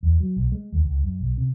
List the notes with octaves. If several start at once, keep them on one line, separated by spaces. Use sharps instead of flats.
E2
F#3
B1
G#3
D#2
C#2
F#2
B1
C3